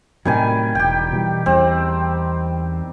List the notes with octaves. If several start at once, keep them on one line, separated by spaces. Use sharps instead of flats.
A2 C3 D#3 F#3 G3 G#5
E1 G4 G5
B2 E3 G3
E2 G3 C4